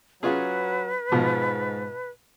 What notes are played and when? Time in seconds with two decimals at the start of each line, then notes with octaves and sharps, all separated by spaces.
0.23 F#3 C#4 F4 G#4 B4
1.12 G#2 B2 F3